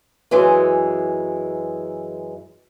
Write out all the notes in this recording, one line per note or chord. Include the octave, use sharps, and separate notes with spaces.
F#2 E3 G#3